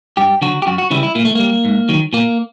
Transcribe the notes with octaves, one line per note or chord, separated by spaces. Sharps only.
G2 G4
D3 F#3 F#4
G4
F#2 F#4
F#4
C#3 E3 G3 E4
E4
A#2 A#3
A3
G3 A#3
G#2
D#3 F#3
A#2 A#3